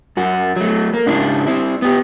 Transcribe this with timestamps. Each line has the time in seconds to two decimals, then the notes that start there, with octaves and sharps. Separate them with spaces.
0.17 F#2 F#4
0.56 F#3 A3
0.94 A#3
1.06 G#2 C#3 D4 E4
1.47 C4 E4
1.82 B3 G4